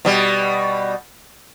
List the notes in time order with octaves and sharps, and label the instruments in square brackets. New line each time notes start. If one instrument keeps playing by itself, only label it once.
[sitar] B2 G3